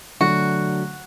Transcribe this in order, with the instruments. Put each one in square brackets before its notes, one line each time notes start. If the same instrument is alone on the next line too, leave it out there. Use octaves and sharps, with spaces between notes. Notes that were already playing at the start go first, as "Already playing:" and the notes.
[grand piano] D3 F#3 A3 D4 [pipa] F#4